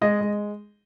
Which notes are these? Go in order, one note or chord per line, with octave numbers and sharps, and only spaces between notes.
G#3 D#5
G#3